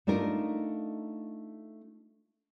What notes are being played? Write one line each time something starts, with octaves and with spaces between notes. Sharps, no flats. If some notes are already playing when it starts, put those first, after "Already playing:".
A3 D4 D#4 F4 A#4